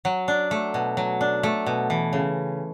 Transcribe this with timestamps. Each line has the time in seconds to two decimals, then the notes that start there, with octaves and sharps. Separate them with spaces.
0.05 F#3
0.28 D4
0.51 A3
0.74 B2
0.97 F#3
1.21 D4
1.43 A3
1.66 B2
1.90 E3
2.13 C#3